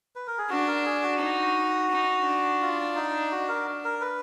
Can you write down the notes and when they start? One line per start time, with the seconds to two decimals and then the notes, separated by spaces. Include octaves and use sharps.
0.16 B4
0.27 A#4
0.38 G#4
0.50 D4 F#4
0.67 A#4
0.85 G#4
1.03 F#4
1.20 D#4
1.91 D#4
2.26 D4
2.62 F4
2.96 D#4
3.31 F#4
3.48 A#4
3.85 A#4
4.01 B4